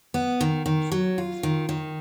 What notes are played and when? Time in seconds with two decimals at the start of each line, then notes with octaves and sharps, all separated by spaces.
0.14 B3
0.41 D#3
0.66 D#3
0.92 F#3
1.18 F4
1.43 D#3
1.69 D#3